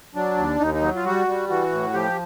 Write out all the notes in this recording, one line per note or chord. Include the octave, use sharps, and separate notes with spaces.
F#3 D4
D#2
D#2 D#4
D#4
F#3
F4
G3 F#4
G3
E3 F#4
A2
F3 G4